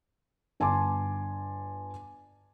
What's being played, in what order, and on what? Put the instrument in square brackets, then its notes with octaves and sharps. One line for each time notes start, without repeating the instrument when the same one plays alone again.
[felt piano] G1 G#5 A5 C6 D6